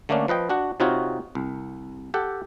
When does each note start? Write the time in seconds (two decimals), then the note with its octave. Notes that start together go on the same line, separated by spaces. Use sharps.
0.09 D3 A3 A#3 C#4 D4
0.28 F3 B4 D#5 G5
0.49 D4 F#4 F#5
0.80 C3 C4 D#4 F4 F#4 C#5
1.35 C2
2.14 G4 A4 F#5